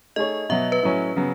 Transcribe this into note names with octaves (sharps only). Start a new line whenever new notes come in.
A3 D#4 G#4 C#5 D#5
B2 F#3 B3 E5
B4
A2 F#3 C#4
C#3 F#3 B3